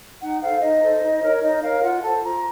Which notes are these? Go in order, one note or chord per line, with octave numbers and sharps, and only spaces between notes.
D#4 F#5
A4 C5 F5
D#4 D#5
A4 C5
D#4
A#4 C#5
D#4 D#5
A#4 C#5 F5
F4 F#5
A4 C5 A5
F4 A#5